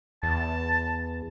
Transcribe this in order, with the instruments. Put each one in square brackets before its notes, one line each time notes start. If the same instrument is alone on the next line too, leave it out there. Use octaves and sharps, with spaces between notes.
[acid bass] E2 [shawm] A5